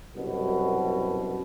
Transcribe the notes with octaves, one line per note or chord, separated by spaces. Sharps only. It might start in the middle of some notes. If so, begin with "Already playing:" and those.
C2 F#2 B2